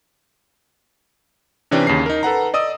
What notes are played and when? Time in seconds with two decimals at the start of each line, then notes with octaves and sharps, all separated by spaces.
1.71 C3 E3 C#4 D4 G4
1.87 D#2 C#3 C#4 C7
2.06 D#4 A#4
2.23 A4 B4 F#5 A#5
2.54 D5 D#5 D#6 E6